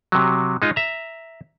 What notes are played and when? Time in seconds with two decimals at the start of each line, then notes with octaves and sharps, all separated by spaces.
0.12 C3 F#3
0.62 G#3 D#4 F4
0.76 E5 A#5